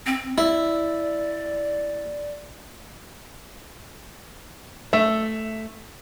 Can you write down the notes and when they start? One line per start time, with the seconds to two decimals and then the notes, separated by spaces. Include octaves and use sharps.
0.06 C4
0.38 E4 D5
4.93 A3 E5